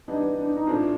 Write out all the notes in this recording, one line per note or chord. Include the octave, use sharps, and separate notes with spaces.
E3 G3 B3 D4 D#4
D4
D#4
A2 F3 A3 C4 D4 F4